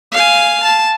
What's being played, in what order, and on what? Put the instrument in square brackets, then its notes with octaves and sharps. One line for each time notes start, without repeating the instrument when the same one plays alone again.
[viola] F5 G#5
A5